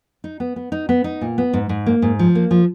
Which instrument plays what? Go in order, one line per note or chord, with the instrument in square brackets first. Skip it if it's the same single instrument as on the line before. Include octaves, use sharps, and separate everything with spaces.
[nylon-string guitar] D#4
B3
B3
D#4
B3
D#4
A#2
B3
G#2
G#2
A#3
G#2
F3
A#3
F3